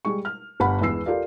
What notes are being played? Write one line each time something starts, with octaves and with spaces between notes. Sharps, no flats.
G3 G#3 C#6
F6
G1 F#5 B5
E2 E3 G#3 B3 E6 C7
F4 G4 A4 A#4 D5 F5